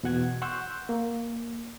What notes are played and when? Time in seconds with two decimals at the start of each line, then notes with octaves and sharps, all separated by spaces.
0.03 E2 B2 F#5 G#6
0.42 F#5 C6 C#6 E6 F#6 G6
0.89 A#3